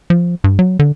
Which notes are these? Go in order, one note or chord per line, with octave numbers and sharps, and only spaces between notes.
F3
G2
F#3
D3